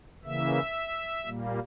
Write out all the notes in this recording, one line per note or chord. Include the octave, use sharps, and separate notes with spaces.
C#3 E3 A#3 E5
A#2 G3 A#3